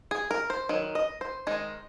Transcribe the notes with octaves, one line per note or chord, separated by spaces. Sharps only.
G#4
A#4
C5
D#3 F#3
D#5
C5
D#3 G#3 D#4